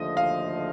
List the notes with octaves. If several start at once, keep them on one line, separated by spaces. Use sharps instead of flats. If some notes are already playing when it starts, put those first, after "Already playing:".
Already playing: D#2 D3 F3 A3 D#5
F5